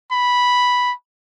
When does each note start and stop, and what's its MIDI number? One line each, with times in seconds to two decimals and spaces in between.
0.12 0.93 83